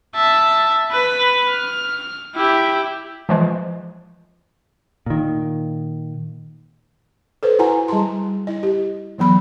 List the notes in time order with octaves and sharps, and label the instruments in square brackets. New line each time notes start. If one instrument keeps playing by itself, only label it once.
[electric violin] E5 A5
B4
F6
E4 G4
[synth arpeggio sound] E3 F3 G#3
[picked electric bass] A#2 D#3
[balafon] A4 B4 C5
E4 F#4 F#5 G#5 A#5
G3 G#4 A5 A#5 C6
E4 D#5
G4
E3 F#3 B3 B5